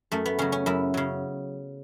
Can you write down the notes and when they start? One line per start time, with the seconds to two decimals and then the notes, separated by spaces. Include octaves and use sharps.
0.12 F#2 A3
0.26 B3
0.39 C#3 F#3 C#4
0.52 C#4
0.66 F#2 E4
0.94 C#3 F#3